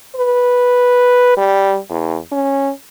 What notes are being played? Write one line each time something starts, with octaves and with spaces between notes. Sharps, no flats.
B4
G3
E2
C#4